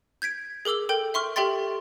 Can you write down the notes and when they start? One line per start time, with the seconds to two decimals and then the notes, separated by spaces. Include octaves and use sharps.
0.22 G6 G#6 B6 D7
0.65 G#4 A#4 D6 E6 F#7
0.89 A4 A#4 G5 G6
1.14 E5 C6 C#6 F6
1.36 G4 A4 E5 G5 C6 A6